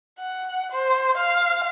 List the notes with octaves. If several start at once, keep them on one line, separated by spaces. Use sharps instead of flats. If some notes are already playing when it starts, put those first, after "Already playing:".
F#5
C5
F5